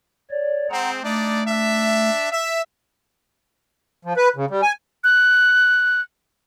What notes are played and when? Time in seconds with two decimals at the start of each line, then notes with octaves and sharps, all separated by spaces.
0.31 C#5 D5
0.70 G#3 C4 F#5 A#5
1.03 A3 D4 D#4 D5
1.47 D4 E5
2.32 E5
4.05 F3
4.17 B4
4.36 C#3
4.50 G3
4.62 G#5
5.04 F#6